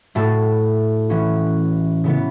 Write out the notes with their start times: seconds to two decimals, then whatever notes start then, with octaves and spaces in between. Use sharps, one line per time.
0.15 A2 A3 F#4 A4
1.10 E3 C#4 F#4
2.04 C#3 E3 B3